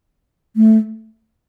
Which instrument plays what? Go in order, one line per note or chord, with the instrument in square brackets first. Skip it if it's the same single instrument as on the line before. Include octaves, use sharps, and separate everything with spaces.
[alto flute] A3